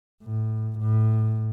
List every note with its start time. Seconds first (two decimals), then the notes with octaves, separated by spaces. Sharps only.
0.23 A2
0.79 A2